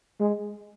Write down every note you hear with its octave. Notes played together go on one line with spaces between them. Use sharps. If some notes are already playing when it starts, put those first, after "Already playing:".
G#3